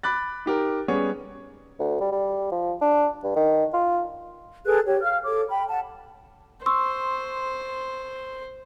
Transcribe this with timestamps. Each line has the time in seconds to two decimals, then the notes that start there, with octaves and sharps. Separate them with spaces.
0.03 B5 D6 F#6 A6
0.46 D#4 G4 A#4
0.88 G3 B3 C#4 G#4 C#5
1.80 D2
2.01 G3
2.12 G3
2.52 F3
2.81 D4
3.24 G2
3.36 D#3
3.74 F4
4.65 G#4 A4 B4 F#6
4.85 G4 C#5
5.02 F5 F6
5.23 A4 C#5 D6
5.49 G5 B5
5.68 F#5 A5
6.66 C5 C6 C#6 E6